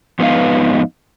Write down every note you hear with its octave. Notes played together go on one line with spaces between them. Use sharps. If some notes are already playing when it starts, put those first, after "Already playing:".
F2 G#2 B3 D#4 B4 F5